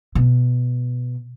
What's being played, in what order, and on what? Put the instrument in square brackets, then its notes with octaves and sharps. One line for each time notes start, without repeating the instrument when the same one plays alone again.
[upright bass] B2